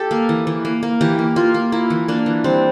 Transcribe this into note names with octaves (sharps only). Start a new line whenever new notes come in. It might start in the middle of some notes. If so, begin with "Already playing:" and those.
Already playing: G4 A4
A#3
E3
E3
A#3
A#3
E3 G4
A#3
A#3 F4
A#3
A#3 E4
E3
A#3 D4
E3
G3 C4